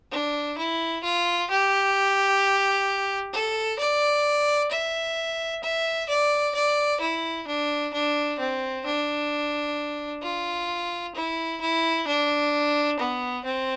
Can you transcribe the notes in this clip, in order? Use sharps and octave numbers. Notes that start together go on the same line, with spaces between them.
D4
E4
F4
G4
A4
D5
E5
E5
D5
D5
E4
D4
D4
C4
D4
F4
E4
E4
D4
B3
C4